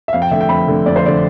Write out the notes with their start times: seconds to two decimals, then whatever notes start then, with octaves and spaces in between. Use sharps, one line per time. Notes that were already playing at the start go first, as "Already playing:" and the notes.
0.08 E5
0.13 F2 F5
0.22 G5
0.31 D3 A3 E5
0.41 G5
0.49 F2 B5
0.68 D3 A3
0.86 F2 D5
0.96 C5
1.04 D3 A3 D5